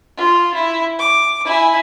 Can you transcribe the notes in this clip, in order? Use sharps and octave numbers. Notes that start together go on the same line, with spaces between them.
F4
E4
D6
E4 G#5